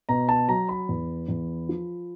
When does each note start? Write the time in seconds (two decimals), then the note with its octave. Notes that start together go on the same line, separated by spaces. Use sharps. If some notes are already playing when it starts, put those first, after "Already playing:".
0.09 B2 A#5
0.29 A5
0.48 F#3 A#5
0.69 B5
0.89 E2
1.28 E2
1.69 F3